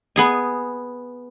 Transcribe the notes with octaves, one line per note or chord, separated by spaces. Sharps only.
B3 G#4 G#5